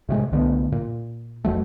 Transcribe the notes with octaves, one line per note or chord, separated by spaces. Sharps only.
A2 C3 G#3
C2 D3 A3 B3
A#2
F1 E2 F#3 A3